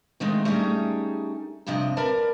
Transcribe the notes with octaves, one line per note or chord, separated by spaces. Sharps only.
D#3 F3 G#3 A3 C4 D#4
G3 A3 C#4 D#4 G#4 A4
G2 C3 F3 C4 D#5
A#4 B4 D5 A5